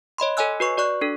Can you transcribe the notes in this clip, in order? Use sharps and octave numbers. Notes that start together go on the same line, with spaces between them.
C#5 D#5 B5 C6
A4 C#5 D#5 G#5 E6 F#6
F#4 B4 C#6
F#4 D5 C#6 F#6
D4 A4